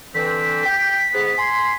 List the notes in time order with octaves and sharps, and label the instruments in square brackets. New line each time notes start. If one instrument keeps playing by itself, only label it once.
[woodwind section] D3 E3 C4 [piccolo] B6
[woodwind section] G5
G#2 D3 B3
G#5 C6